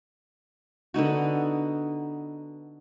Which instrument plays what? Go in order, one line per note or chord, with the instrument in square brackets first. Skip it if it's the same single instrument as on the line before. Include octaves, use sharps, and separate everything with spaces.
[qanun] D3 B3 D#4 F#4